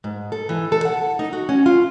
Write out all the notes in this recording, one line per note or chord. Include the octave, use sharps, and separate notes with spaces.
G#2
A4
E3
A4
F#5
D#4
F#4
C#4
F4